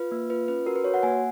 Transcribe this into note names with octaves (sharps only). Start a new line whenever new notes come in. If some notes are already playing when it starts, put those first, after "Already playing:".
Already playing: F4 B4
A#3
F4 B4
C#4 B4
F#4 A#4
B4
F#4 C#5
F#5
A#3 G#5